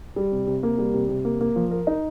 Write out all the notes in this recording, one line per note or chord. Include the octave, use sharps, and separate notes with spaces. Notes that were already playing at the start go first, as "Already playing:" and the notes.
G3
C3
C3
A#3
G3
C3
C3
A#3
A#3
F3
A#4
D#4